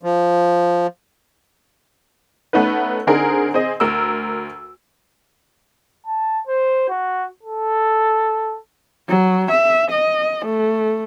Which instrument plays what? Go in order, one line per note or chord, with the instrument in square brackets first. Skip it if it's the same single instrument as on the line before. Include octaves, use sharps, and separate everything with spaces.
[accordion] F3
[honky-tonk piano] A3 B3 C#4 D#4 B4
D3 C4 D4 D#4 G#4 A#4
C4 G#4 D#5
D2 A#4 E6
[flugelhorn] A5
C5
F#4
A4
[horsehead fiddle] F#3
E5
D#5
A3